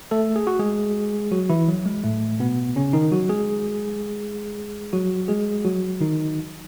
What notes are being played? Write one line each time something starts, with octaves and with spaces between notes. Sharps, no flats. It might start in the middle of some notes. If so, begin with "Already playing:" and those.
A3 A4
G#4
F#4
G#3 G#4
F#3 F#4
E3 E4
F#3
G#3
A2 A3
B2 B3
C#3 C#4
D#3 D#4
F#3 F#4
G#3 G#4
F#3 F#4
G#3 G#4
F#3 F#4
D#3 D#4